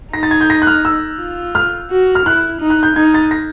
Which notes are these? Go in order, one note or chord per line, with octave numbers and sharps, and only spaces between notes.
D#4 A#6
A6
G#6
G6
A#6
F#6
F6
E6
F4
F6
F#4
F6
E4 F#6
D#4
F#6
G6
D#4 G#6
A6
A#6